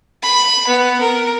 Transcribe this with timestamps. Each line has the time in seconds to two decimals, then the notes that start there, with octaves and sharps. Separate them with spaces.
0.23 B5
0.67 B3
1.00 A#4